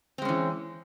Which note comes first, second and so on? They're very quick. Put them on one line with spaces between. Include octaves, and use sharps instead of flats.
C4 G#3 C#4 E3